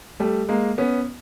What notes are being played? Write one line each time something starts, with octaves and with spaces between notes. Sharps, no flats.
G3 A3
G#3 A#3
B3 C#4